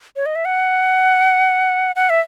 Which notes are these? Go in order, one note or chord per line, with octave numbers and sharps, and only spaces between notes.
C#5
D#5
E5
F#5
F#5
E5